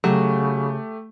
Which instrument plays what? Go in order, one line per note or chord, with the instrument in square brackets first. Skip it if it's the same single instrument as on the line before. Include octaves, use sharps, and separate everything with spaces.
[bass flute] C#3 [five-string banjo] F#3 [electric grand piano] A3 G4